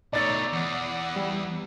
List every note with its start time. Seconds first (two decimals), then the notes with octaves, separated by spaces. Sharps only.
0.13 B2 A3 D#4 C#5 D5 A6
0.53 E2 F#5
1.16 G3